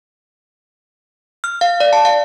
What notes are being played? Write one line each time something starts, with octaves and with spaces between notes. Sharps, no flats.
F6
F5
D5
A5
F5